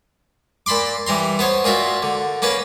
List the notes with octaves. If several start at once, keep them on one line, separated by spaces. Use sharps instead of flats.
A#2 A5 B5 C6 D6
E3 G3 A#5 C6
B3 C5 C#5
A#2 F4 F#4 E5
D3
A#3 C#4 B4 A5